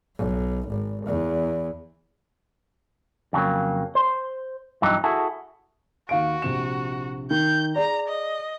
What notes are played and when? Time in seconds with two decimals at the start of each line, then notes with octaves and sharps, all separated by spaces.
0.17 B1
0.68 G#1
1.06 E2
3.33 F2 C#3 E3 F#3 A#3
3.95 C5
4.82 G2 B2 E3 F#3 D#4
5.04 E4 F#4 G#4 A4
6.09 D#2 F#4 F5 D7
6.42 A#1 C3 E7
7.31 D#3 G6
7.76 G#4 D5 A#5
8.08 D#5